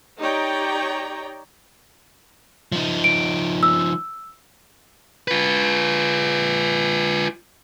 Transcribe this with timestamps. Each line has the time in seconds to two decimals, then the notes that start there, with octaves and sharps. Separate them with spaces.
0.19 D#4 G4 C#5 D5 G5 A#5
2.72 F3 D#4
3.04 D7
3.63 E6
5.28 F4 B4